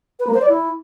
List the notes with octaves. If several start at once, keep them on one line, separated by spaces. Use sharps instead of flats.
B4
A#3
C5
D5
E4